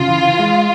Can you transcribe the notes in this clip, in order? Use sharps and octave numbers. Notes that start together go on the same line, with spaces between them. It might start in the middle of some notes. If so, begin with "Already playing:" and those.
Already playing: C#3 F4
E3
E3
G#3